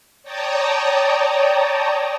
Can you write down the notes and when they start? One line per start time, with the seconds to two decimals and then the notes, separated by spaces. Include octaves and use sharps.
0.23 C#5 D5 G5 A5 A#5 D#6